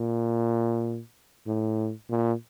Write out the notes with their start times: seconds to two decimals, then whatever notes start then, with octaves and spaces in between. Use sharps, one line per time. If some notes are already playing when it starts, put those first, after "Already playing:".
Already playing: A#2
1.47 A2
2.10 A#2